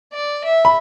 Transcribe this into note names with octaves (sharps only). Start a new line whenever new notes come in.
D5
E5
B5